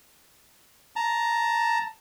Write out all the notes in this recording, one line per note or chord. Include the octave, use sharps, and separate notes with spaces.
A5 A#5